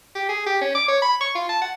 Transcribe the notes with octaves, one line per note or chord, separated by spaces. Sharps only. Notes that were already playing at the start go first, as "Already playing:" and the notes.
G4
G#4
G4
C#4
D6
C#5
B5
C#6
F4
A5
F#5